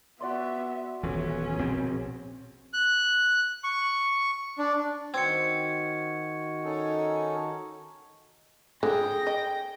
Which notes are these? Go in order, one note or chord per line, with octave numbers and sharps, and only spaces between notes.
B3 F#4 D5 E5 C6
D#1 E3 B3 C#4
A#1 B2 C4
F#6
C#6
D4
D#3 C4 F#4 G#6 C#7
C#4 D#4 A4
D3 G#4 G5 A#6
D#5